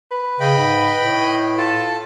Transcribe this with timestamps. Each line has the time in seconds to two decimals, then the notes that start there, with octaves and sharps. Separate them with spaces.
0.11 B4
0.40 C#3 D#5 G5 B5
0.57 G#2
1.00 A2
1.58 F4 A4 A5